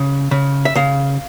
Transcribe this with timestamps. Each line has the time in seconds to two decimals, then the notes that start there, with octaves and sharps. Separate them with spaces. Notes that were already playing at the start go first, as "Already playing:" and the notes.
Already playing: C#3
0.31 C#3
0.65 E5
0.75 C#3 F5